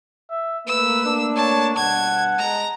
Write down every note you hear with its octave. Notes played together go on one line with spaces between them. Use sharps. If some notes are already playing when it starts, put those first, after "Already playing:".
E5
A3 A#3 B4 E6
D4
C#5 A5
G2 B2 F#5 A5 G#6
G#3 A#5